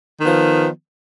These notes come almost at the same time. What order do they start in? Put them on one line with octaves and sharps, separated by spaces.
D#3 B3 F3